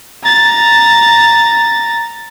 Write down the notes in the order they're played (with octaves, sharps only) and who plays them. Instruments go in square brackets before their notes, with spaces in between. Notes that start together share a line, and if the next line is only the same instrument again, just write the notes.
[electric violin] A#5 A6